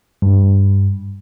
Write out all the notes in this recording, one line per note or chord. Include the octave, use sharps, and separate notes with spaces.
G2